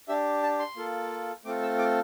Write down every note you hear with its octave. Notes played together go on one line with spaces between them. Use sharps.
D4 G4 E5
A5
C6
A#3 F4 A4
A3 C4 F4 A4 D6
E6
D6